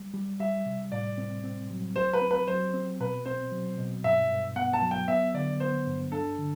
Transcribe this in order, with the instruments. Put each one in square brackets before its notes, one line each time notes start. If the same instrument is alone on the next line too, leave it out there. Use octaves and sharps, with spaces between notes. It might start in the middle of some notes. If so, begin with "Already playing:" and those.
Already playing: [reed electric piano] G3
G3
[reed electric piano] G3 [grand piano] E5
[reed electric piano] C3
[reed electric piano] A2 [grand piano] D5
[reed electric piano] C4
C4
F#3
[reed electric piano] G4 [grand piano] C5
[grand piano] B4
[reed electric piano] C4
[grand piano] B4
[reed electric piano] F#3 [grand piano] C5
[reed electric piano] C4
[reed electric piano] B2 [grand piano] B4
[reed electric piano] C4 [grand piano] C5
[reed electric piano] F#3
B2
[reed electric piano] G2 [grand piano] E5
[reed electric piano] G2
[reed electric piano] B3 [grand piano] F#5
[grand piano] A5
[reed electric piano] F#3
[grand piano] G5
[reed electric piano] B3 [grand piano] E5
[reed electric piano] D3 [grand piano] D5
[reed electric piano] B3 [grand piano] C5
[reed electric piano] G2
[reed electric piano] D4 [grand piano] A4
[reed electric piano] D3